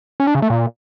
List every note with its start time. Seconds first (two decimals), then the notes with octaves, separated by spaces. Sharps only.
0.20 C#4
0.27 D4
0.35 C#3
0.42 A3
0.50 A#2